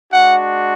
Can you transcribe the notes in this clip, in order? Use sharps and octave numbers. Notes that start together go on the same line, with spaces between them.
G#3 D4 F#4 F#5